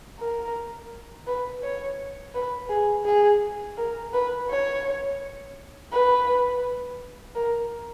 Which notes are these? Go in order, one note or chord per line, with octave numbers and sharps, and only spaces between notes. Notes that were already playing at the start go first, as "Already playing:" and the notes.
A#4
B4
C#5
B4
G#4
G#4
A#4
B4
C#5
B4
A#4